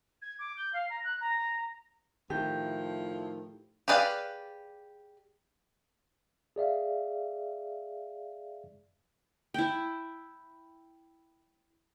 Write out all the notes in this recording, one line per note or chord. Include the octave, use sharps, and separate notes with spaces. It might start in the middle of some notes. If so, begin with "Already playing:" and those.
G#6
D6
G6
F5
A#5
F#6
A#5
A2 D#3 F3 E4 G4
G4 G#4 B4 D5 F5
G#4 D5 E5 F5
E4 G5